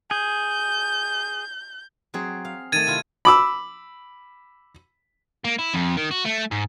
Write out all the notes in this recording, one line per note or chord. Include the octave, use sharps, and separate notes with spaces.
G#4 G6
F#3 C4 G#4
F5
D#3 A3 G#6 A6 D#7
C3 E4 F4
B5 D6 E6
A#3
E4
F2
D#3
F#4
A3
G#2